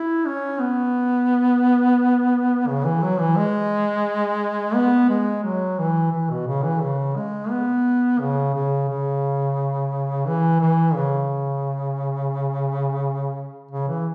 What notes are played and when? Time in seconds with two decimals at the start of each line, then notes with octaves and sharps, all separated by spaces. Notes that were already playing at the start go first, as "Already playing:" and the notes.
Already playing: E4
0.25 C#4
0.60 B3
2.67 C#3
2.85 E3
3.02 F#3
3.19 E3
3.36 G#3
4.75 B3
5.09 G#3
5.43 F#3
5.78 E3
6.12 E3
6.30 B2
6.47 C#3
6.64 E3
6.81 C#3
7.16 G#3
7.50 B3
8.19 C#3
8.54 C#3
8.88 C#3
10.26 E3
10.60 E3
10.95 C#3
13.71 C#3
13.88 E3